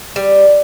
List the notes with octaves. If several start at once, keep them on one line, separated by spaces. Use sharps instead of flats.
G3